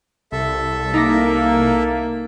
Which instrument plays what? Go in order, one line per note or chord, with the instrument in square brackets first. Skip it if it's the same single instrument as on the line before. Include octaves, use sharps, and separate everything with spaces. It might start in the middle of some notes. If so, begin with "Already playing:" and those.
[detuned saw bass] C2 [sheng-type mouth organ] A4 E5
[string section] A#3 [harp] D#4 D6 A#6